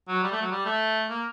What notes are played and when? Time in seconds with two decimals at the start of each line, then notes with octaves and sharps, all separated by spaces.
0.08 F#3
0.23 G3
0.32 A3
0.42 F#3
0.52 G3
0.65 A3
1.09 A#3